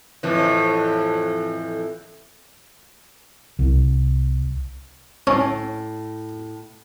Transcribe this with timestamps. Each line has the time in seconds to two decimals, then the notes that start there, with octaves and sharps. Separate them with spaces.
0.23 F2 A2 E3
3.59 C2
5.27 A2 C#4